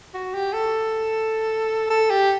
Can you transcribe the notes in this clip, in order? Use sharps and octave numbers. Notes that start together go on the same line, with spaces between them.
F#4
G4
A4
A4
G4